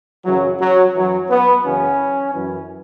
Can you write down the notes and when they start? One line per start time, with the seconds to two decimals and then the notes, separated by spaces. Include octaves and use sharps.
0.24 F#2 C#3 E3 F#3
0.60 F#3
0.94 F#2 E3 F#3
1.29 B3
1.64 F#2 C#3 E3 C#4
2.34 F#2 E3